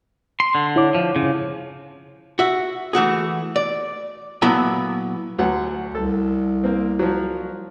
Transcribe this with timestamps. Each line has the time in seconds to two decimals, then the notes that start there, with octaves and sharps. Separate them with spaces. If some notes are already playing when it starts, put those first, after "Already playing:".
0.40 C6
0.55 D3
0.76 E4 C#5 D6
0.95 F3
1.16 C#3
2.39 F#4 E5
2.93 E3 A3 F#4 G#4
3.56 D5
4.42 A#2 F#3 B3 E4 A4 G#5
5.39 D2 F#3 F#5
5.95 C2 A4
6.64 A#3 C4
6.99 F3 F#3